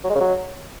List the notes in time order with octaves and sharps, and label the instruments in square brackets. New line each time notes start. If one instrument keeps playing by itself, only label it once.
[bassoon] F#3
G#3
C#3
F#3